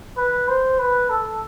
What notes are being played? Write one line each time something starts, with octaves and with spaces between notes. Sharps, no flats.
B4
C5
B4
A4